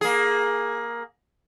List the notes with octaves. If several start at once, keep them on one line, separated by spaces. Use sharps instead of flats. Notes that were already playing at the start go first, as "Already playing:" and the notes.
A#3 G#4